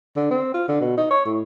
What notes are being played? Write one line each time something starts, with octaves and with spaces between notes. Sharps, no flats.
D3
C4
F4
D3
B2
D#4
C#5
A2